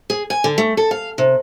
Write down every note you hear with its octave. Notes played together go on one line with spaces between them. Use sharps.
G#4
G#5
D3
A3
A4
F5
C3